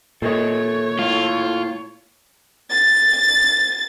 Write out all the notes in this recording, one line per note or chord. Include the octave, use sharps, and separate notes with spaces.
A#2 A4 C#5 D#5 E5
A3 E4 F4
A6